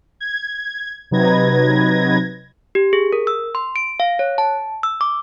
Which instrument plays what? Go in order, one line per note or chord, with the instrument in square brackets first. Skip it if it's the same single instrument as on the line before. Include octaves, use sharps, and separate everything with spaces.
[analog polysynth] G#6
C3 F#3 D#4 B4 G#6 A#6
[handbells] G4
G#4
A#4
E6
C6
D7
F5
C#5
A5
E6
D6